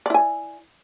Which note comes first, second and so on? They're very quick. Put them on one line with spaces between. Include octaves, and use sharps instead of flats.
D5 E4 G#5